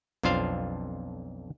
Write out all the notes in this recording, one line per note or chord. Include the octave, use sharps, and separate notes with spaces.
B1 F2 D4 F4 C5 F5